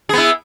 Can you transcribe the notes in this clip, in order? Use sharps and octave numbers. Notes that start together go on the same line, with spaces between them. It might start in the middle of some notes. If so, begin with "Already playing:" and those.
B3 E4 G#4